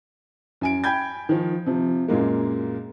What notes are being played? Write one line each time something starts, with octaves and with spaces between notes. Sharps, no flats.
F#2 G#5 D7
G5 G#5 B5 G6 G#6
D#3 F3
C3 F3
F#2 A#2 G#3 A#3